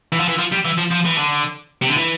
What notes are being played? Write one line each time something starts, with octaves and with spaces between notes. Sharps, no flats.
E3
F3
E3
F3
G3
E3
F3
F3
E3
D3
C3
D3
E3